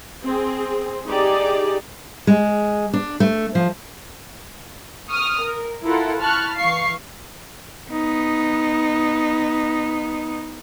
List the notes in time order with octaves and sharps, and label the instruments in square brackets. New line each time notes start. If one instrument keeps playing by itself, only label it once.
[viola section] C4 G#4
D#4 G4 G#4 D5
[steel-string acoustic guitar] G#3
D4
A3
F3
[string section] C#6 D#6 F6
A#4
E4 F4 A4 A#4 F#5
A5 B5 C#6 F6 F#6
E3 F5 C#6 C7
[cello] B3 D#4